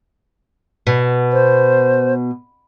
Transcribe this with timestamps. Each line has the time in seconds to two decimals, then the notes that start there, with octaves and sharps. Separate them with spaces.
0.87 B2
1.33 C5